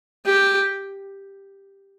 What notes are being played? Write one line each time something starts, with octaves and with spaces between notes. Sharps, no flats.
G4